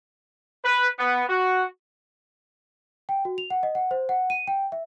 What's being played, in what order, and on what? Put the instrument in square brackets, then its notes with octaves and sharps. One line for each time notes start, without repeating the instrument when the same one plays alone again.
[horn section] B4
B3
F#4
[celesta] G5
F#4
F7
F#5
D#5
F#5
C5
F#5
D#7
G5
E5